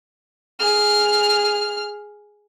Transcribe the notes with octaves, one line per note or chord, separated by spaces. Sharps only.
G#4 F6